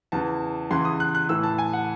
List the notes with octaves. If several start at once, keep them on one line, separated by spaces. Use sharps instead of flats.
E2 C#3 E3 A5
E2 C#3 E3 C6
D#6
F#6
F#6
A2 E3 E6
A5
G#5
F#5